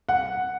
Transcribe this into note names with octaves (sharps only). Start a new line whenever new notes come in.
F#5